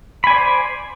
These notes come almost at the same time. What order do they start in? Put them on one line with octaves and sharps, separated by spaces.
B5 G#5 D5 C5